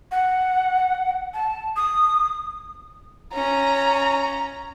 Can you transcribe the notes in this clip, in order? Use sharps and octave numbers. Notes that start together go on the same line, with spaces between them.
F#5
A5
D#6
C#4 A#5